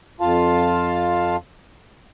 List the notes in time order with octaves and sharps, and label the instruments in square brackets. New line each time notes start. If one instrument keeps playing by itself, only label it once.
[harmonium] F2 F4 F5 A5